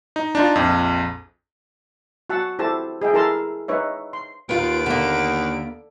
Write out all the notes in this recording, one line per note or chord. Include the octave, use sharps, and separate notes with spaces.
D#4
D4 D#4 F4
A#1 F2
F#4 F#5 A5 E6
E4 G4 A4 C5 A5
G#4 D#5 E5 G5
E4 A4 A#4 A5 A#5 C6
D#4 B4 C#5 E5
C6
D#2 B3 F4 D7
D3 A#3 B3